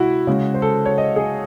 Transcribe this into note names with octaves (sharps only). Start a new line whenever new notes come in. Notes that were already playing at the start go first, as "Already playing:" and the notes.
Already playing: C3 G#3 E4 F#4
C#3 G#3
C5
A4
C#5
D#5
G#4